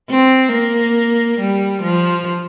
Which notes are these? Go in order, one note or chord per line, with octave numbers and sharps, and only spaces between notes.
C4
A#3
G3
F3